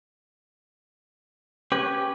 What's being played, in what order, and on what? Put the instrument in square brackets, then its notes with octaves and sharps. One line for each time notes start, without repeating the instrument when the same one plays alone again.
[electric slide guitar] C#4 B4 [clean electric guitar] G4